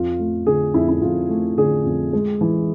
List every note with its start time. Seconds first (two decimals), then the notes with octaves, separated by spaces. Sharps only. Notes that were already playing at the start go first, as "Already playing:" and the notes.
Already playing: F2 F4
0.20 A3
0.47 D3 G#4
0.74 F2 E4
0.89 E4
1.02 F2 F4
1.29 A3
1.58 D3 G#4
1.85 F2
2.13 G#3
2.41 E3